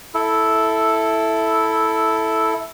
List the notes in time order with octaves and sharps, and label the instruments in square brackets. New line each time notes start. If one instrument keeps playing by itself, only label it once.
[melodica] E4 A4